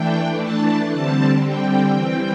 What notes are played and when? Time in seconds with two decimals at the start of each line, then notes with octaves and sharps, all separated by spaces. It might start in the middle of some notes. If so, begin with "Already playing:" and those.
Already playing: E3 A3 D4 G5
0.42 A5
0.93 D3 G3 C4 A5
1.44 G5
1.94 E3 G3 C4